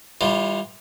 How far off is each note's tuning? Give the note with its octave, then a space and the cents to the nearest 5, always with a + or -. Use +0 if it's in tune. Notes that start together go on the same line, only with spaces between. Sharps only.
E3 -25 G3 +20 F4 +0